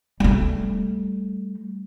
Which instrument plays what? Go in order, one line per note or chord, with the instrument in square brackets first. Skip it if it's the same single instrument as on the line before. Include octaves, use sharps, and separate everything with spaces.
[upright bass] G3 A3